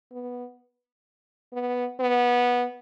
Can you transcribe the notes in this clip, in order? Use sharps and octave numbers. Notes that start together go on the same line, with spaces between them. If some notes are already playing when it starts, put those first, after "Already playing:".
B3
B3
B3